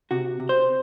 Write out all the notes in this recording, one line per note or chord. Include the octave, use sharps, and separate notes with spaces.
C3 F#4
C3
C5